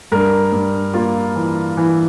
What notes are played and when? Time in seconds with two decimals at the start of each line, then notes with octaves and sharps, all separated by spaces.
0.12 G2 A#4
0.53 G2
0.94 A#3 F4
1.35 E3
1.77 E3